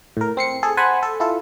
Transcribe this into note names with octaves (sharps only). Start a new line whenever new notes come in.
A2 A#4
C4 C7 C#7
G#4 A4
C5 F#5 G#5 A5 B5
A4
E4 F4 A4